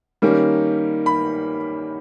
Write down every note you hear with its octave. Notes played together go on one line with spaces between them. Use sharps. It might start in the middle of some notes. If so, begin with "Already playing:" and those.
D#3 G3 A#3 C#4
B5